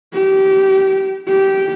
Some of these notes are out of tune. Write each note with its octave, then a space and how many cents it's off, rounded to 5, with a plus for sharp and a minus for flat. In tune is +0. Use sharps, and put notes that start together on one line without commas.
G4 -25
G4 -15